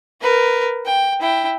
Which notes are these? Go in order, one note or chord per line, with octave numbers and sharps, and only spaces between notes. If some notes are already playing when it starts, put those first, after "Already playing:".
A#4 B4
G5
E4 G5